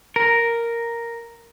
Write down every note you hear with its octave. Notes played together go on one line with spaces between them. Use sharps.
A#4